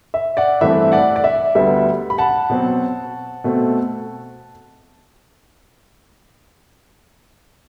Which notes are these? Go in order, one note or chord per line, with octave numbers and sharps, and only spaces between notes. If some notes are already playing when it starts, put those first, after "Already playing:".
E5
D5 F#5
G2 E3 A3 C4 E5
D5 F#5
D5
E5
D2 D3 G3 B3 E5
B5
F#5 A5
B2 F#3 C4
B2 A3 C4